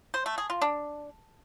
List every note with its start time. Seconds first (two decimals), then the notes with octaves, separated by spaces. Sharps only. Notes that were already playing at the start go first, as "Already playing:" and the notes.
0.14 C5
0.26 A3
0.38 G#4
0.50 F4
0.62 D4